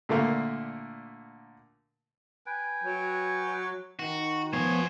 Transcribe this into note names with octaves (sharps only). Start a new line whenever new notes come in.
A#2 D3 A3 A#3
B4 G5 G#5
F#3
D#3 F#4
F3 B3 C5 C#5 G#5